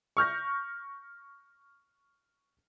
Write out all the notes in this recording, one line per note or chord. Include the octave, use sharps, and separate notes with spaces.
C#6 F6 G6 A#6